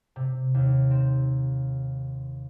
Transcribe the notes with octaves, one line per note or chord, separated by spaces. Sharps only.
C3
D#2
C4